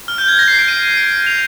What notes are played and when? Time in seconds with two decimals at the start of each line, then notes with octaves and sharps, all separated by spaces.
0.08 F6
0.18 G6
0.28 G#6
0.39 A#6
0.48 C7
0.59 D7
0.68 D#7
0.97 D7
1.27 F7